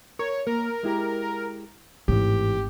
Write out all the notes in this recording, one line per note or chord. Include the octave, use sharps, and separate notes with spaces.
A#4 C#5
A#3 A#4
G#3 E4 G4
G#1 A2 E3 G4